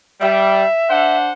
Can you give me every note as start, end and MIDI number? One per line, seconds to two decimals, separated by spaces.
0.20 0.63 55
0.20 1.16 76
0.90 1.31 62
0.90 1.31 72
0.90 1.31 78